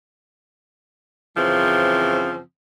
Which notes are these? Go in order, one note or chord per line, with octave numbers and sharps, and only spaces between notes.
F#2 C#3 E3 F3 C4